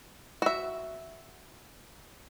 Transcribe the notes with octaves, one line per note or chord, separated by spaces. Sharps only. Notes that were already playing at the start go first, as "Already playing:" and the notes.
F#4 E5